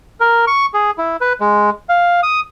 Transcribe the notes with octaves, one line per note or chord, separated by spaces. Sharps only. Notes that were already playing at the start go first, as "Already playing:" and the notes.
A#4
C#6
G#4
E4
B4
G#3
F5
D#6